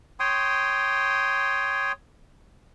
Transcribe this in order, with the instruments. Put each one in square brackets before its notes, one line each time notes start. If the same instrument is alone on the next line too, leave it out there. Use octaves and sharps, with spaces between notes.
[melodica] C#5 G5 C6 D#6